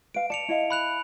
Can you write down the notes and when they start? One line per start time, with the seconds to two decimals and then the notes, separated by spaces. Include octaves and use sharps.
0.14 B4 F5 D7
0.30 D5 A5 C#7 F7
0.49 E4 D#5 F5
0.70 B5 F#6 F7